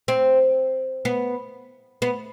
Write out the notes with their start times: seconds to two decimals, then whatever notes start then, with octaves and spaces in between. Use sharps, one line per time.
0.08 C4
1.05 B3
2.02 B3